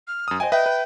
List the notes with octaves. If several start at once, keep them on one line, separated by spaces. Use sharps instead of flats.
F6
F#2 D#6
C5 D#5 G5 G#5
B4 D#5 E5 G5
B4